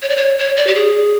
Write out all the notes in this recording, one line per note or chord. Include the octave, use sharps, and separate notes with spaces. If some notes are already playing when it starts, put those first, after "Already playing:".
C#5
D5
C#5
C#5
D5
G4
G#4